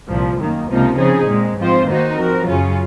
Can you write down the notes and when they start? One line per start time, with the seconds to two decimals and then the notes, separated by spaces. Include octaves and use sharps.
0.09 C2 A#2 F3
0.38 F#2 D#3 A#3
0.69 C#2 C3 F3 A#3 D#4
0.98 C#3 F3 C4 D#4 G#4
1.27 A#2 G#3 C4
1.58 G#2 F3 C4 F4 C5
1.87 D#3 A#3 D#4 F#4 C5
2.17 F3 C4 F#4 A#4
2.47 F#2 C#3 F#3 C#4 F4